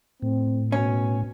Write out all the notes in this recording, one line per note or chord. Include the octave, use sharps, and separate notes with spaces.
A2 C4
B2 C#4